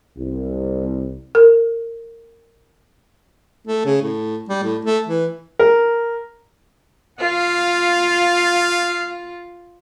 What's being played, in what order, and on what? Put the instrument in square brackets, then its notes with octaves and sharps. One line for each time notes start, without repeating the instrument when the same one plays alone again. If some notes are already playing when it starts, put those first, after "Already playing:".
[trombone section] C2
[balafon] A#4
[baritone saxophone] A3
C#3
A2
G3
A2
A3
E3
[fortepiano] A#4
[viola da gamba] F4 [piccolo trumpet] F5